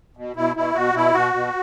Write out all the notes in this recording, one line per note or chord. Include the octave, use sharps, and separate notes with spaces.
B2
B2 E4
B2 E4
B2 F#4
B2 E4
B2 F#4
B2